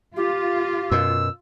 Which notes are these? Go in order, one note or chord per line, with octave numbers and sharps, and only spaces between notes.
F4 G4
F#2 B2 E6